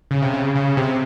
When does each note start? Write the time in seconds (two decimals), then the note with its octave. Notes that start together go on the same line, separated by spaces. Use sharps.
0.11 C#3
0.22 C3
0.34 C#3
0.55 C#3
0.77 C3